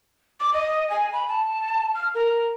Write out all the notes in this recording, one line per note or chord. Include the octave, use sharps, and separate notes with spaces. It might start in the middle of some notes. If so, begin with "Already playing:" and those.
D6
D#5
G#5
B5
A5
F6
A#4